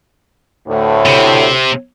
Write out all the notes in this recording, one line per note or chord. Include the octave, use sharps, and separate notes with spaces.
D2 A2
C3